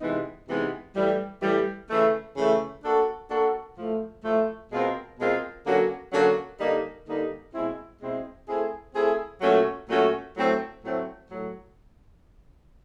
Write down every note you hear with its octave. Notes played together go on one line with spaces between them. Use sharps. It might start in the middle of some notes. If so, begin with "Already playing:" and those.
C3 E3 G#3 B3 D#4
C3 E3 G#3 B3 D#4
A2 E3 G3
A2 E3 G3
C#3 E3 A3
C#3 E3 A3
A#3 D4 F#4 A4
A#3 D4 F#4 A4
A2 F3 A3
A2 F3 A3
B2 G#3 C4 F4 A#4
B2 G#3 C4 F4 A#4
D3 F#3 A#3 C#4 F#4
D3 F#3 A#3 C#4 F#4
D3 G3 A#3 D#4
D3 G3 A#3 D#4
B2 G#3 C4 E4
B2 G#3 C4 E4
A3 C4 E4 G#4
A3 C4 E4 G#4
A#2 F#3 A3 C#4 F#4
A#2 F#3 A3 C#4 F#4
A2 F#3 A3 C4
A2 F#3 A3 C4
A2 F#3